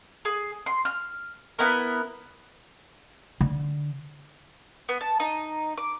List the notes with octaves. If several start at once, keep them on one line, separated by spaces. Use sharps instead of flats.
G#4
C6
F6
B3 E4 A#4
D3
B3
A5
D#4
D6